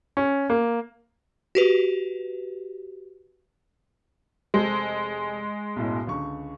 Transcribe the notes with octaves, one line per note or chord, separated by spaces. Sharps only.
C#4
A#3
F#4 G4 B4
F1 G#3 A4 C5
B1 F#2 A2
C#2 D3 C#6